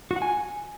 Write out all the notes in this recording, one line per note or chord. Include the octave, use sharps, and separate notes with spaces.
F#4
F#5
G#5